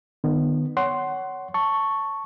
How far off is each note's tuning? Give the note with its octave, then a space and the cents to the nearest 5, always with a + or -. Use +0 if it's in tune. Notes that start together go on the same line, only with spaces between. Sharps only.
D#3 -40 B3 +0
C#5 +15 F#5 +20 C6 +5
A5 +15 C#6 +0